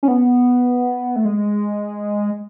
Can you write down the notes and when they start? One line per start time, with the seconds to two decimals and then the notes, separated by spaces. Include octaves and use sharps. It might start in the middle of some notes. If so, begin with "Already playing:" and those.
0.03 C#4
0.08 B3
1.16 A3
1.25 G#3